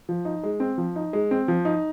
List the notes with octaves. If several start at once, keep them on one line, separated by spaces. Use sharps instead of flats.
F3
D#4
G#3
C4
F3
D#4
G#3
C4
F3
D#4